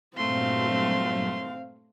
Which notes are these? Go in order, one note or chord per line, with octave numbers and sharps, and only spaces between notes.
G2 A#2 F#3 A3 C4 F5 C6